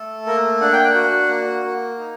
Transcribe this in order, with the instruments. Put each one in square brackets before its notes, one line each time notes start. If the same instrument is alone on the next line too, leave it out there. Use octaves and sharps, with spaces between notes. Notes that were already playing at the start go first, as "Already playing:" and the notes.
Already playing: [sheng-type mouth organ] A3 A4
A#3 A#4
D4 F#5
G5
F#5
F#4
A#3
A#3
D#4